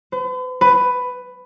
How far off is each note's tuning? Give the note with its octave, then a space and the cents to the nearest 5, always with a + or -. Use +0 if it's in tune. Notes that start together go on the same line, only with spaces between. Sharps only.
B4 +45
B4 +10